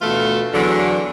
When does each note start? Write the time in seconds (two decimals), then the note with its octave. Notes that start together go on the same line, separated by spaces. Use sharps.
0.02 D2 B2 E3 A3 F4 A4
0.54 E2 D3 F#3